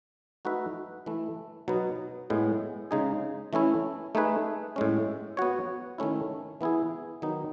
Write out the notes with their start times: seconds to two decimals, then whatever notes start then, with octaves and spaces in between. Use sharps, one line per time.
0.45 A3 D#4 F#4 B4 E5
1.06 E3 A3 E4
1.68 B2 F#3 B3 D#4
2.30 A2 G#3 B3
2.91 C#3 G#3 D#4 G#4
3.53 E3 A3 C#4 E4
4.15 A3 D#4 G#4 B4
4.76 A2 G#3 C#4
5.37 B3 F#4 C#5
5.98 D#3 A3 C#4 E4
6.61 E3 B3 E4 G#4
7.22 D#3 F#3 B3 D#4